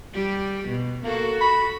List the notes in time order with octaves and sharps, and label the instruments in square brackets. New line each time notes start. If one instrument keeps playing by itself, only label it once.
[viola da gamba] G3 G4
B2
[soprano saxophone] A#3 [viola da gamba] F#4 A4
[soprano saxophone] B5